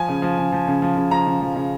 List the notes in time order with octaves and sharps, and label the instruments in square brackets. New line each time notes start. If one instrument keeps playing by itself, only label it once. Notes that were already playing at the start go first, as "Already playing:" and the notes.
Already playing: [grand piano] F3 G#5
C#3
F3
C#3
F3
C#3
F3
C#3
F3 A#5
C#3
F3
C#3